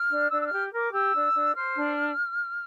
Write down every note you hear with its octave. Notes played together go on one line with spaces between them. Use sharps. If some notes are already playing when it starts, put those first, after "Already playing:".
Already playing: F6
D4
D4 E6
E6
F6
G4
A#4
D6
G4 E6
D4
D4
C5 F6
D4